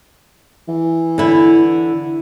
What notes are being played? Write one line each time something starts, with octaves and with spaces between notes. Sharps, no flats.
E3
D3 E4